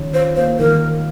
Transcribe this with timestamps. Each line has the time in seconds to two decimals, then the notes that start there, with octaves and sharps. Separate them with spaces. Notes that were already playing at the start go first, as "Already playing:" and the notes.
Already playing: D#3 C#4 F4
0.14 F4 C5
0.36 A#3 C5
0.59 D#3 A#4